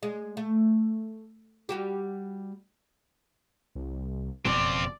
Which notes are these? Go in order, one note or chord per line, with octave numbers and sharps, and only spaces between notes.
G#3
A3
G3 F#4 G4
C2
F#1 F2 B2 F#3 C4 F4 D5